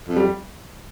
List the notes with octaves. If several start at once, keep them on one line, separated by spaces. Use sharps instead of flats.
F2
G3